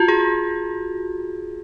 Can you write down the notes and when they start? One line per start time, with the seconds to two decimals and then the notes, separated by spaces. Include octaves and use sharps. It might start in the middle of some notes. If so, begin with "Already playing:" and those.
Already playing: F4 F#4
0.08 G#4